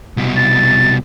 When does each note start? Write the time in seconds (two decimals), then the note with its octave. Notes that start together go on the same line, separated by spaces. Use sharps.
0.17 C2 B2
0.36 A6